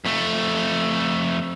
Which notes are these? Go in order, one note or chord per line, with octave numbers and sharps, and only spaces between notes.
F2 A3